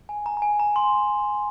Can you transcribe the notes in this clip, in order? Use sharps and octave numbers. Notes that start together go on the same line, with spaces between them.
G#5
A#5
A#5
G#5
A#5
C6